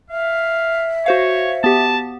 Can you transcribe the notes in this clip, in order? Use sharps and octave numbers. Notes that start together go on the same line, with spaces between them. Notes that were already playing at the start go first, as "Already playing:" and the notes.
E5 F5
F#4 C5 C#5 F5
B3 G4 A5